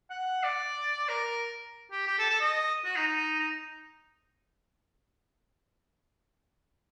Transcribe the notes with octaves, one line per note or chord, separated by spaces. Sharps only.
F#5
D5
A#4
G4
G4
A4
A4
D#5
F#4
D#4
D#4
D#4